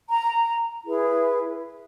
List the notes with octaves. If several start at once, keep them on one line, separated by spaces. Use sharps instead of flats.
A#5
E4 G#4 B4